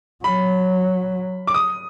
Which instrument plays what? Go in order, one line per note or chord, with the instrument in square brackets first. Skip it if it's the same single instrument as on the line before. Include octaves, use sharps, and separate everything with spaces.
[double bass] F#3 [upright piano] B5
[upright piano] D6
D#6